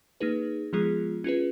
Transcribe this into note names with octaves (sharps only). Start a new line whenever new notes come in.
A#3 D#4 G#4 B4
F3 G#3 B3 F4 G#4
C#4 F4 G#4 B4